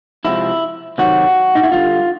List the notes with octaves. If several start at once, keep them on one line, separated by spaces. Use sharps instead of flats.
C3 F3 G#3 E4
C3 D#3 F#3 F#4
D#4
E4
D3 G3 F4